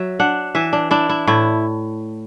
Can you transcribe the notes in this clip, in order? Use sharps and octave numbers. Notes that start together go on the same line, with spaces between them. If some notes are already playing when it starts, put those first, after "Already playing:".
Already playing: F#3 E5
D4 F#5
E3 E5
D4
D4 E4
E4
A2 E4